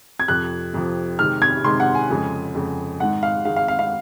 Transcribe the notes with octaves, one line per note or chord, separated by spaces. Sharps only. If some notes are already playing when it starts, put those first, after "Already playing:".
G#6
F2 C3 F3 F#6
F2 C3 F3
C3 D#3 G#3 F6
G#6
C3 D#3 G#3 C6
F#5
G#5
F2 C#3 G#3
F2 C#3 G#3
G#2 D#3 G#3 F#5
F5
G#2 D#3 G#3 F5
F5
F5
F5